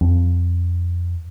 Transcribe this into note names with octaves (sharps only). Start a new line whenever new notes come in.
F2